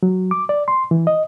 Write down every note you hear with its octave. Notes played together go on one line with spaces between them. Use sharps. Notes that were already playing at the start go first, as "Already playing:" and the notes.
F#3
D6
D5
C6
E3
D#5